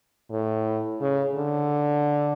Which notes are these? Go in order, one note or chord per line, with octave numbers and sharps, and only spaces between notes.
A2
C#3
D3